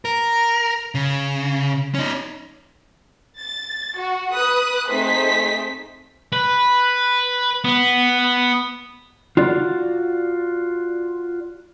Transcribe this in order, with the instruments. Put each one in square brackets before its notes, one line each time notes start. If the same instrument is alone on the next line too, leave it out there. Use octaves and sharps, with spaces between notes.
[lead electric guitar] A#4
C#3
C#4 D#4
[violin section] A6
F#4
B4 D#6 F#6
A3 C4 D#4 G#4 C5 B6
[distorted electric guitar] B4
B3
[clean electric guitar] F4 F#4 D5